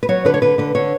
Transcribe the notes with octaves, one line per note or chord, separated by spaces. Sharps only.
B4
F#3 C#5
D3 B4
C#5
D3 B4
D3 B4
D3 C#5